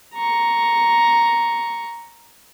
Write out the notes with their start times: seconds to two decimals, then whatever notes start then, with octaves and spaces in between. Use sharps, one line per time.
0.13 A#5 C#6